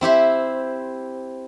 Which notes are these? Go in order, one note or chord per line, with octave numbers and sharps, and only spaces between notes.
C4 E4 G4 C5